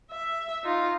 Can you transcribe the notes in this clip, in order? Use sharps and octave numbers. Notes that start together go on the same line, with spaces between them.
E5
D#4 F4